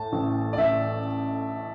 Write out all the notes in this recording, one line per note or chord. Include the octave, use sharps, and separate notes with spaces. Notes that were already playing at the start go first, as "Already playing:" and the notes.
Already playing: A2 A5
A1
D5
A1 E5